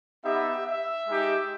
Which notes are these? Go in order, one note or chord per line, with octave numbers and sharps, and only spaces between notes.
B3 D#4 G4 E5
E5
G#3 D#4 G4